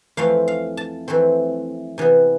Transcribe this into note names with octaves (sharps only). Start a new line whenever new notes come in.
F2 E3 A3 C4 F5
F5
A5
F2 E3 A3 C4
C3 E3 B3